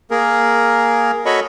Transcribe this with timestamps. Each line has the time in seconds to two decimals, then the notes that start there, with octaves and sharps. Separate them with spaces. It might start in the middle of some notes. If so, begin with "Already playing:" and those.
0.11 A#3 G#4 A#4
1.26 F#4 A4 C#5 D#5 B5 C#6